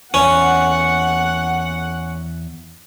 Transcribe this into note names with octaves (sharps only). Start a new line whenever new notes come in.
E2 C#4 F#5